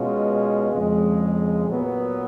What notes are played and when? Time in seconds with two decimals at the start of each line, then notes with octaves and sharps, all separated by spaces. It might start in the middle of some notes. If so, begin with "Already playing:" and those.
Already playing: B2 G#3 C#4 F4
0.72 F2 C#3 G#3
1.68 A#2 F#3 B3